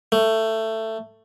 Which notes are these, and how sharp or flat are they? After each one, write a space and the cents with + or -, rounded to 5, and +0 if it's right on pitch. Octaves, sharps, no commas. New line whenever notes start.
A3 +15